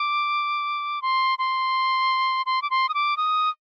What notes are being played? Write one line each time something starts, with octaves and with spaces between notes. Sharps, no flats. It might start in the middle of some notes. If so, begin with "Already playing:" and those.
Already playing: D6
C6
C6
C6
D6
C6
D#6
D6
D#6